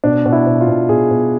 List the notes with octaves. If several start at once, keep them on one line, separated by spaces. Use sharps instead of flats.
B2 D4
B2
E4
B2
F4
B2
B2 G#4
B2